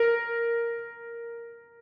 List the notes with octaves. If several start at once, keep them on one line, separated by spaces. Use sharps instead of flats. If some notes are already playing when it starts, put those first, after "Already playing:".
Already playing: A#4